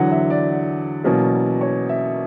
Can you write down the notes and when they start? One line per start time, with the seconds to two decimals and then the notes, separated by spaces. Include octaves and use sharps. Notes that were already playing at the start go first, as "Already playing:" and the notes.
Already playing: E2 D3 F#3 F#5
0.11 E5
0.30 D5
1.04 E2 B2 F#3 A#3 C#4
1.61 C#5
1.89 E5